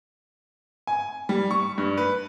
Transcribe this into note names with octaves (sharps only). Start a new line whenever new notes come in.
G#5
G3
C#6
G2
B4